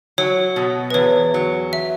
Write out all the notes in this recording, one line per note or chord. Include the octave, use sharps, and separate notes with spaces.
F#3 C#5
B2
B4
E2 C#5
F#3
E5